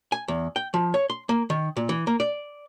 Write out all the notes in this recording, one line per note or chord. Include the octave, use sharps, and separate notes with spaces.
G#5
E2
G5
F3
C#5
C6
A#3
D#3
A#2
E3
A#3
D5